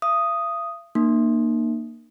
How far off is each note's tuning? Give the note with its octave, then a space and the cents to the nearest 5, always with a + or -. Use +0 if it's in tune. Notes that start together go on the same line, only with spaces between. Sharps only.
F5 -45 D#6 +0
A#3 +0 D#4 -45